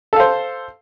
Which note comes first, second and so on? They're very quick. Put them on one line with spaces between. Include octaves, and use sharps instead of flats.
A4 F5 C5